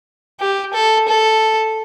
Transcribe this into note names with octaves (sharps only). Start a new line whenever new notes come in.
G4
A4
A4